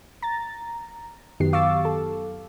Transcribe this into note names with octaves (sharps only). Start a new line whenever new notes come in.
A#5 A6
F#2 D#3 F#3 B3 G4 C7
F5 C#6 D6 E6 A6
A4